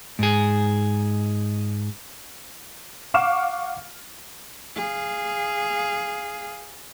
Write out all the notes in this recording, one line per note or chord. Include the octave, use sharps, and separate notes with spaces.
G#2 G#4
F5 F#5 C#6 D6 F6 E7
G#4 F5